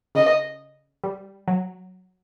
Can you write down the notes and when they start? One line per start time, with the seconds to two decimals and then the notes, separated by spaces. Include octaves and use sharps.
0.15 C#3 D#5
1.04 G3
1.48 F#3